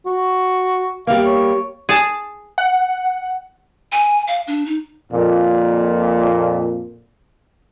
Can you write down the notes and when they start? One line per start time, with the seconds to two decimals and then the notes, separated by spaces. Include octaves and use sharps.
0.06 F#4
1.07 G3 A#3 F5
1.26 C#5
1.89 G#4 A5
2.58 F#5
3.92 G#5
4.27 F5
4.47 D4
4.66 D#4
5.13 F2 A#2